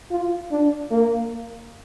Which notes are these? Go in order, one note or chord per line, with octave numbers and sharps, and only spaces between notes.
F4
D4
A#3